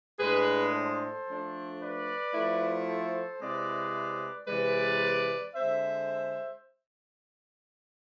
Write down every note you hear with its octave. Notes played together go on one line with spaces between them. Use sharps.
A2 G#3 D4 G#4 B4
A4 C5
F3 A3 D4
B4 D5
F3 A3 E4
A4 C5
C3 G#3 C4 E4 B4 D5
C3 E3 G#3 B4 D5
D3 G#3 C4 C5 E5